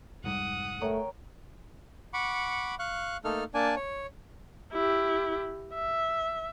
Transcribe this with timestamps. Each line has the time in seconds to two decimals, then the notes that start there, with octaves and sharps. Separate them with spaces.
0.24 F1 G#2 G3 F#5 D#6
0.81 A3 A#4 C#5 G5
2.14 F#5 B5 C#6 D6
2.79 F5 C#6 F#6
3.24 A3 A#3 D#4 A4 F6
3.54 A#3 D4 D5 G#5 A5
3.76 C#5
4.73 E4 G4
5.74 E5